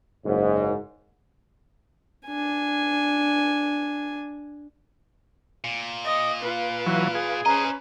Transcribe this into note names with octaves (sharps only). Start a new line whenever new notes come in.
F#1 G#2
D4 G#5
A#2
D#5
F4 B4
E3 F#3
G#4
C#4 B4 C5 D#5 A#5